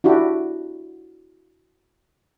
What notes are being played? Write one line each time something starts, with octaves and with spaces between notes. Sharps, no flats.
D4 E4 F#4 G4